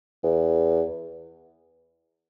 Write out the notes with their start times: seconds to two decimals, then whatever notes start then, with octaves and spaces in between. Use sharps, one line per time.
0.23 E2